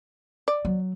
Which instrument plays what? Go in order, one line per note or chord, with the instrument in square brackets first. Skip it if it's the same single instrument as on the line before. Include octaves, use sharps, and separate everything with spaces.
[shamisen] D5
[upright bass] F#3